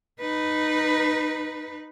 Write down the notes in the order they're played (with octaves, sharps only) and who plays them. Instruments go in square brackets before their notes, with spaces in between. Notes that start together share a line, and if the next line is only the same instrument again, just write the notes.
[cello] D#4 B4